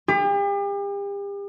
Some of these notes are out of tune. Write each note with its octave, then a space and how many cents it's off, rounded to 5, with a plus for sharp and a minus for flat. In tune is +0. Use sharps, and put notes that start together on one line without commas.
G4 +40